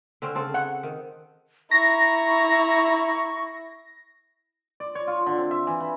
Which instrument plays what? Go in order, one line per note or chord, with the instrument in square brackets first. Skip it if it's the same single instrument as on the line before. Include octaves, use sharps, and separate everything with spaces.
[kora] D3 C4 C#4
C#3 C4 A4
[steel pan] F#5
[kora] D#3
[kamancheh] E4 [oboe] A#5 [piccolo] C#6 [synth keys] A#6
[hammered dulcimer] D5
C#5
F4
D3
C4
E5
E3
B5